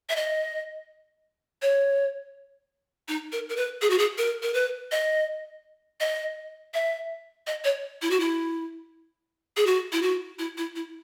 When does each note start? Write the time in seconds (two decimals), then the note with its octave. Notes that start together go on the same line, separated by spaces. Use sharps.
0.09 E5
0.16 D#5
1.62 C#5
3.08 D#4
3.32 A#4
3.49 A#4
3.56 B4
3.81 G#4
3.90 F#4
3.98 G#4
4.18 A#4
4.42 A#4
4.54 B4
4.91 D#5
6.00 D#5
6.74 E5
7.47 D#5
7.64 C#5
8.02 E4
8.11 F#4
8.20 E4
9.56 G#4
9.66 F#4
9.92 E4
10.02 F#4
10.39 E4
10.57 E4
10.76 E4